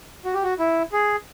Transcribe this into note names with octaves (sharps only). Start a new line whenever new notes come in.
F#4
G4
F#4
E4
G#4